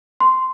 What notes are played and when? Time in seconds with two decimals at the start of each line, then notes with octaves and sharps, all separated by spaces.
0.20 C6